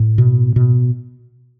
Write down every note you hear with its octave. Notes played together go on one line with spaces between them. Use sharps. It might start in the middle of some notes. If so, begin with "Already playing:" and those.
Already playing: A2
B2
B2